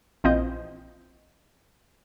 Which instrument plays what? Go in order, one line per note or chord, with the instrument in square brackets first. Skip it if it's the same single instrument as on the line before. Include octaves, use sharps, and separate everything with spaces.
[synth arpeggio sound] A#1 E3 C4 F4 D#5 G6